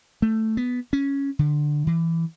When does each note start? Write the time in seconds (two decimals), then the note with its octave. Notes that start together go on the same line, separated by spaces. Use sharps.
0.22 A3
0.57 B3
0.93 C#4
1.39 D3
1.87 E3